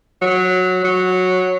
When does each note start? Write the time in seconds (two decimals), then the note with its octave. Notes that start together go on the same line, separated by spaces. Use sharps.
0.22 F#3
0.84 F#3